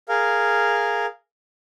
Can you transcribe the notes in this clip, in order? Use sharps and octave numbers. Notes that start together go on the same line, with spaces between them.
G#4 A#4 F5